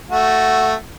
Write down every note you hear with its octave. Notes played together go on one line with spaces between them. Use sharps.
A3 F#4